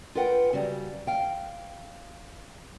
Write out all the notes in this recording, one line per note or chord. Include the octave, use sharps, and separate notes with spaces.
F4 A#4 B4 F#5 G5
C#3 F#3 G3
F5 G5